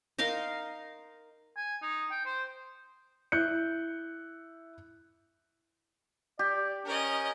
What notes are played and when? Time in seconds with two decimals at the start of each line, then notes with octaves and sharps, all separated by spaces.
0.18 D#4 A#4 F5 C6
1.57 G#5
1.82 D#4
2.11 G5
2.25 C5
3.32 E4 F#6 G6 C#7
6.39 G4 D5
6.85 C#4 A#4 D#5